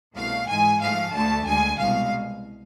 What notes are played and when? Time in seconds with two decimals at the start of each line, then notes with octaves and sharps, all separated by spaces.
0.15 C2 B2 A3 F5
0.48 G#2 E3 G#3 G#5
0.81 G#2 F3 A3 F5
1.12 D2 D3 A3 A5
1.45 D2 D3 G#3 G#5
1.77 C2 B2 G#3 F5